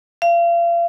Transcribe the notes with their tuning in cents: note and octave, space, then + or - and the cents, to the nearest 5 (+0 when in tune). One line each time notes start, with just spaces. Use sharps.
F5 -35